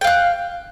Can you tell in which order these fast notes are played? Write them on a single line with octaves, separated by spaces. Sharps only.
G5 F5 F#6